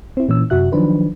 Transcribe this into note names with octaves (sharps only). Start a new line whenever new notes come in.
C4 E4
A#2 E3 C#4 E6
F#2 C3 F#4 E5 F#6
D#3 F3 F#3 D4 B4 C5